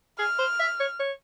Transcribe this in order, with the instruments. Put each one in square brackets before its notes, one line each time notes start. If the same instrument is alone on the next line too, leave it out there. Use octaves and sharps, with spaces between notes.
[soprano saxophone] G#4 [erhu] F6
[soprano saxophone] C5
E5
C#5
C#5